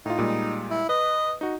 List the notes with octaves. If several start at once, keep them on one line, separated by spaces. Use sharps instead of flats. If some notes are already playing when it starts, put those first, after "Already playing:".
A2 D#4 F4
A#2 G3 G#3
E4
B4 D#5
D#4 F#4